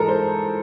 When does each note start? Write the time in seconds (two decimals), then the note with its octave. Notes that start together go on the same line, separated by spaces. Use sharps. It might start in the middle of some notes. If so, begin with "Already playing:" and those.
Already playing: G#2 E3 G#3 A4 A#4
0.08 C5